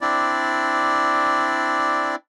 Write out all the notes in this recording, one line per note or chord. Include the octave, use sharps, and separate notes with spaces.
C4 D4 E4 D5